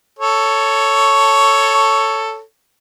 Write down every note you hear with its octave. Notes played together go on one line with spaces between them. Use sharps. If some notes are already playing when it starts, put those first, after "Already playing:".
A4 C#5